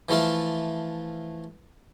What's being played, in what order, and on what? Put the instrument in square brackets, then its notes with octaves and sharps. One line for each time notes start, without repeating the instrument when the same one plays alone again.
[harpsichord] E3 F3 A3 F4 A5